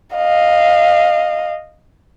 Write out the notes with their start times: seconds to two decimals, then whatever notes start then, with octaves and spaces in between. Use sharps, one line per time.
0.16 D#5 F5